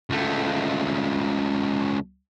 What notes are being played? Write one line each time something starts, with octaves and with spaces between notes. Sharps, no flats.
C#2 A3